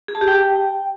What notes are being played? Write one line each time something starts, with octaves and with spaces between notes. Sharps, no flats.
G#4
A5
G4
G5